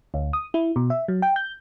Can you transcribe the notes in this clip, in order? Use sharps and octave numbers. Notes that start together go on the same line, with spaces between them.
D2
D#6
E4
B2
E5
F#3
G5
G6